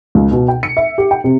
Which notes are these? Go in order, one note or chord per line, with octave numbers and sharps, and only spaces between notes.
C#2
B2
G5
C#7
E5
G4
G5
C3